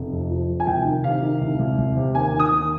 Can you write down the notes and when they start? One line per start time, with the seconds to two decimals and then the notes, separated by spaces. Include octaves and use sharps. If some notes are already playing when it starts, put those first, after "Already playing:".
Already playing: F1
0.12 F2
0.30 F3
0.48 F3
0.60 G#5
0.67 C2 G5
0.85 D#3
1.04 C3 F5
1.22 D#3
1.41 C2
1.59 C2
1.78 C2
1.97 C3
2.15 D#2 G#5
2.33 D#3
2.40 D#6
2.52 D#2